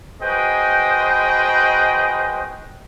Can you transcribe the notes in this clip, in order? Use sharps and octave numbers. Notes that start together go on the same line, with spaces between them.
F#4 G#4 B4 C5 D#5 G5